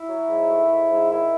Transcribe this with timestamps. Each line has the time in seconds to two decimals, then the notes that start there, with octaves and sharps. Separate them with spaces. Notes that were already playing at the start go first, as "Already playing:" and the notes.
Already playing: E4
0.09 F#3
0.29 G#2
0.50 A3
0.70 G#2
0.90 G#2
1.10 D#3 E4